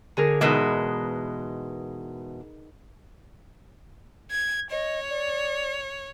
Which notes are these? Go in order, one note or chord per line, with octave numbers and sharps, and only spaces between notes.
D3 G#4 A#4
E2 B2 G#3 D#4 B4
G#6
C#5 D#5
D5